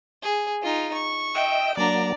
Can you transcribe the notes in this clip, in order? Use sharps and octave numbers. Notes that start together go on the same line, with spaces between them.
G#4
D#4 F4
C#6
D#5 E5 G5
F#3 A#3 D4 D5 A#5